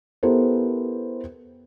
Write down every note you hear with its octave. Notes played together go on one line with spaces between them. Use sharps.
B3 E4 G4 A4 A#4 C5